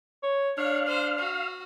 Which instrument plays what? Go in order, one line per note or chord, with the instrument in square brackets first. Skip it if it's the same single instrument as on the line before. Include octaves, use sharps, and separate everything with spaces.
[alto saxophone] C#5
[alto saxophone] D4 [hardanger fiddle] C#5 [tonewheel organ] F5
[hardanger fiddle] C5
F#4